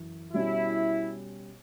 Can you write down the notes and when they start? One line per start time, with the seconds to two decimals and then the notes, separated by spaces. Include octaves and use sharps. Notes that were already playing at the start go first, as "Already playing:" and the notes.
Already playing: F#2 E3
0.33 B2 G3 C#4 E4